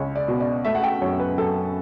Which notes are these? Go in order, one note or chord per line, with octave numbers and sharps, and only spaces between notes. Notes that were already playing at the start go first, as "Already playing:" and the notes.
Already playing: C#2 C#4 C#5
D5
B2
D5
A3 E5
F#5
G5
F#2 C#5
B4
F#2 A4